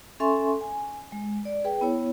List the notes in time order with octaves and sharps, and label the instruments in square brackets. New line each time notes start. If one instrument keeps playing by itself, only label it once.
[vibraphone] C#4 A4 E5 G#5 C6 C#6
G#5
G#3
D5
G#4 B4 G5
B3 E4 C#5